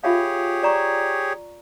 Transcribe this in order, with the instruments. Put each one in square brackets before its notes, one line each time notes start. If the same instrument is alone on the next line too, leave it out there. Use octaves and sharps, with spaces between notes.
[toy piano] F4 E5 F5 [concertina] G4 G#4 C#5
[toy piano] D5 A#5 C#6